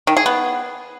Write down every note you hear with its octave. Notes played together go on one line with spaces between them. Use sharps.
D#3
G#4
B3